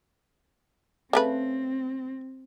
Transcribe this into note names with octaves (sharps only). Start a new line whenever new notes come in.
C#3 A3 C4 B4